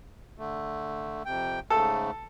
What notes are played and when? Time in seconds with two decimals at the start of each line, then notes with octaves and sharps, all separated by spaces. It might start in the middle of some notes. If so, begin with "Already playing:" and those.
0.39 D3 A3
1.25 F2 C3 G5
1.70 G#2 C#3 A3 A4